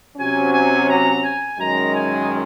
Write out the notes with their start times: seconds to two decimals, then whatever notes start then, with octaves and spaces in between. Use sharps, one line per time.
0.17 C3 F#3 C#4 G#5
0.53 G#5
0.89 A#5
1.24 G#5
1.58 F#2 D#3 G#3 A#5
1.93 G#5